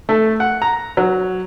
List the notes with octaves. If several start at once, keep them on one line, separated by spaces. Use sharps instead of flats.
A3
F#5
A#5
F#3